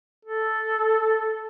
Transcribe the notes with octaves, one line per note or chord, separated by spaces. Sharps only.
A4